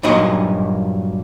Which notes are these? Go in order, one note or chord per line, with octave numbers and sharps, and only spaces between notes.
G2 A#2 F#3 D#4 D#5 C6